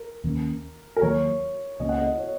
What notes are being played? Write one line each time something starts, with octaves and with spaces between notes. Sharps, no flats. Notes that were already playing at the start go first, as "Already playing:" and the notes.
Already playing: A#4
D#2 D#3 A#3 C#4
A#4
D#2 D#3 F#3 A#3 C#5
C#2 C#3 A#3 C#4 D#5
F#5
D#5
C#5